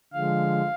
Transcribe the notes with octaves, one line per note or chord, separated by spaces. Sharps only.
D3 F3 G#3 F5